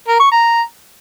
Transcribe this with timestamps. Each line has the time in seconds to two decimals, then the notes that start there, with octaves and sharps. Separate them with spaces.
0.08 A#4
0.19 C#6
0.31 A#5